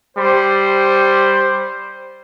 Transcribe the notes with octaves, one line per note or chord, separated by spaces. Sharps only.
G3 C5